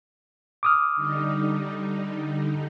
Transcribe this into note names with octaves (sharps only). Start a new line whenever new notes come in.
D6 D#6 F6
D3 G3 D#4